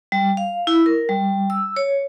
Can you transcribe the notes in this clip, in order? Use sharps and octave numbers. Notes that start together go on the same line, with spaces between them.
G3
F5
E4
A#4
G3
E6
C#5